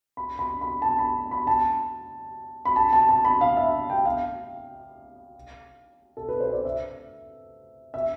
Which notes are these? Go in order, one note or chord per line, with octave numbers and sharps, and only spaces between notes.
B5
B5
B5
A5
B5
B5
A5
B5
A5
A5
A5
B5
F5
E5
G5
F5
A4
B4
C5
D5
E5
E5